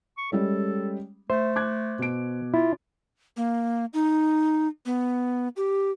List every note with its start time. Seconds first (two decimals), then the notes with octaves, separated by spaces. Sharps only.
0.18 C#6
0.32 G3 G#3 C#4 A4
1.30 A3 C5 E5
1.56 D6 F#6 G#6
1.99 B2 D7
2.54 E4 F4
3.37 A#3
3.94 D#4
4.86 B3
5.56 G4